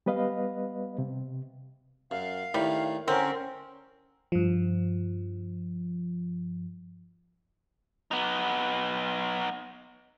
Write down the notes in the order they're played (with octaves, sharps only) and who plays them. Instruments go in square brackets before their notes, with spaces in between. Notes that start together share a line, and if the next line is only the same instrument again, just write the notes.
[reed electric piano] G3 B3 B4 D#5 F5
C3
[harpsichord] F#2 [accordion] F5
[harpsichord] A2 D#3 [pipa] G3
[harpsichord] D3 [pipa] C4 [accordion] C#4 A#4
[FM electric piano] G2 F3
[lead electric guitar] B3 D#4